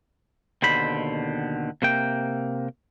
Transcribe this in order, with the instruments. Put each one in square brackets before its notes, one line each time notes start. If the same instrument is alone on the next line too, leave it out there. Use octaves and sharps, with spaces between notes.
[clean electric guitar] D#2 B2 D3 C5 B5
C3 A#3 G5